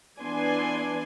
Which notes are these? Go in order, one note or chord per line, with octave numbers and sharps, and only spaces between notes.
E3 B3 D4 D5 G#5 C6